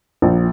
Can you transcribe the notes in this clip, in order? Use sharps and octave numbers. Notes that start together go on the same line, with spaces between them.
A#1